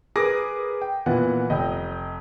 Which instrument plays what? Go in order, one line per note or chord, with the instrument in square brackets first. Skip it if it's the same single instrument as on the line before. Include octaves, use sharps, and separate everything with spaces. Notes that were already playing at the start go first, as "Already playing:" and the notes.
[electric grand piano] G#4 A#4 B4 [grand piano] D6 A#6
[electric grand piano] G5
[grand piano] A#2 E3 B3 [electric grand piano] F#5
[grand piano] F1 [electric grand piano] D#5 G5